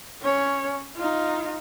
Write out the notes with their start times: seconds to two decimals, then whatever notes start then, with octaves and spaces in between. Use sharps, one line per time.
0.22 C#4 C#5
0.97 D#4 F4